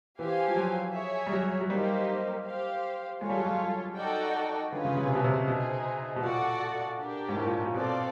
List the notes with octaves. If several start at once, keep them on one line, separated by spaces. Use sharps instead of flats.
E3 G4 C5 F5 G#5
F3
F#3
G#4 C#5 E5
G3
F#3
F#3
G3 A#3 D#4 G4 C5
G4 C5 F5
G#3 F4 A4 C#5
G3
F#3
G3
D#4 F#4 A4 D5 G5
D3 C#4 F4 G#4 B4
C#3
C#3
C3
B2
C3
B2 D#4 G#4 C5
B2
A#2 F#4 A4 D5 F#5
D4 G4 A#4
G#2
A2
A#2
A#2
B2 C4 F4 A4 D5